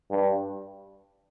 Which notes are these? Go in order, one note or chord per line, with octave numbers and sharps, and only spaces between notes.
G2